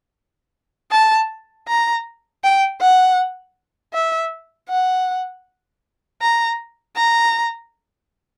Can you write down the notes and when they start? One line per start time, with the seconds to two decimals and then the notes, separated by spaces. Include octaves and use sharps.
0.92 A5
1.68 A#5
2.44 G5
2.81 F#5
3.94 E5
4.70 F#5
6.22 A#5
6.96 A#5